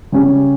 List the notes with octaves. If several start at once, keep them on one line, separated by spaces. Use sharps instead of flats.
C#3 G3 C#4 G4